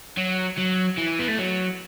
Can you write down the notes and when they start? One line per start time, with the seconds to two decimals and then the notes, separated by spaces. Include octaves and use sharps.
0.17 F#3
0.57 F#3
0.97 E3
1.19 B3
1.28 A3
1.38 F#3